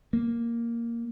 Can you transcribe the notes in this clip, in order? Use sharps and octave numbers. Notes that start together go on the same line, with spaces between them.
A#3